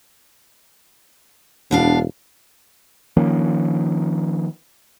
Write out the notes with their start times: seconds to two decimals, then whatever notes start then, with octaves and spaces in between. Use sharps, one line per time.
1.71 E1 B2 D4 F5
3.17 D#3 F3 A#3 C#4